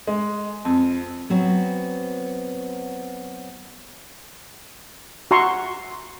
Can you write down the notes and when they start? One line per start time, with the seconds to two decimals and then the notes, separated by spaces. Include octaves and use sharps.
0.07 G#3
0.65 F2
1.30 F#3 B3 C4
5.31 F#4 E5 A#5 C6 C#6